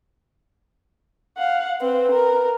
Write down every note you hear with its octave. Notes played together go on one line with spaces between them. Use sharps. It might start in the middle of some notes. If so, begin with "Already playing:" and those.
F5 F#5
C4 B4
A#4